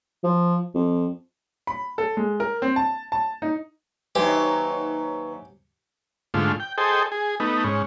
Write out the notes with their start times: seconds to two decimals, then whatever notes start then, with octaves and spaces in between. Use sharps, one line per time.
0.24 F3
0.75 F2
1.67 B5
1.98 A4
2.17 G#3
2.40 A#4
2.62 C4
2.76 A5
3.12 A5
3.42 D#4
4.15 D#2 F#3 D#4 G4 B4 C5 E5 G#5
6.34 G#2 D3 A3 F4
6.60 G5
6.78 G#4 A4 C5 D#5 G5
7.12 G#4
7.40 A3 B3 D#4
7.64 G#2 C#4